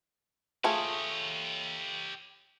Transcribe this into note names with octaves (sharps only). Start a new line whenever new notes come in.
A3 F4 G4 G#4 C#5